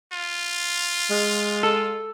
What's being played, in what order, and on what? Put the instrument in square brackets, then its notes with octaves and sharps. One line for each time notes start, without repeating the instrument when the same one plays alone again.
[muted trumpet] F4
[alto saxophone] G#3
[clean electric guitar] A4